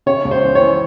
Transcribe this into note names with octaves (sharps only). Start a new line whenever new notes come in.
C#3 C#5
C#2
C5
E3
C#5
E3